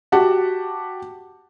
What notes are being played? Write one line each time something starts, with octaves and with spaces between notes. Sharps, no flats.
F#4 G4 F#5 A5